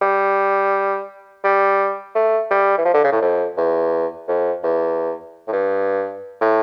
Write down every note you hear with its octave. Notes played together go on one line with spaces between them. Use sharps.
G3
G3
A3
G3
E3
F3
D3
C#3
A2
F2
E2
F2
E2
A2
G2
A2